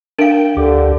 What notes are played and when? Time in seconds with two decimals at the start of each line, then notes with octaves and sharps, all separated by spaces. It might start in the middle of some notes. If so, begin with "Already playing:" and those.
0.19 D4 A#4 F5 G5
0.57 D2 D3 G4